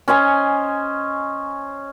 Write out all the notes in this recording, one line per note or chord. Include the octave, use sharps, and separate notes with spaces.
C#4 C5 D#5 G#5